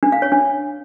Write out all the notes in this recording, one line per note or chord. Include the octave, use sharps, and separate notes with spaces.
D4
F5
C#5
D4